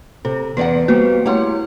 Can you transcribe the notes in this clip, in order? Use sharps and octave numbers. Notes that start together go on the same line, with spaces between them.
C3 A4
E2 B4 D5 F#5
G3 A#3 B3 F#4 B4 C5
A3 E4 G4 C#5 F#5 C6